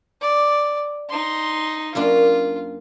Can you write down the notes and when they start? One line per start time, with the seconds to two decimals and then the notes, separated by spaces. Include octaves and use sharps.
0.21 D5
1.09 D#4 C6
1.95 F#2 A#3 D4 F4